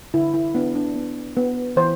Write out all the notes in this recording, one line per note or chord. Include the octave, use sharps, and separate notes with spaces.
D3 E4
E4
B3 D4
D4
B3
B3
E3 C5